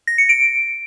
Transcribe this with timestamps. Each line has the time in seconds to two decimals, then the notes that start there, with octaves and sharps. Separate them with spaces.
0.07 A#6
0.18 C#7
0.29 D7